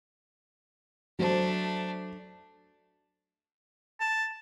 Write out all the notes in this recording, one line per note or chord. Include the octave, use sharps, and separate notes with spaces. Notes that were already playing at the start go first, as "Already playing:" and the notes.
F#3 A3 D4 C5
A5